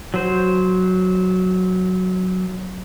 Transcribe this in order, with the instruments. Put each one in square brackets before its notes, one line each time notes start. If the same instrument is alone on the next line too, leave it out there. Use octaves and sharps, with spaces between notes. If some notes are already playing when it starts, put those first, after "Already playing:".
[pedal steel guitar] F#3 C5